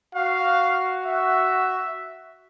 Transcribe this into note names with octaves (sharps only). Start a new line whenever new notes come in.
F#4 F5
E5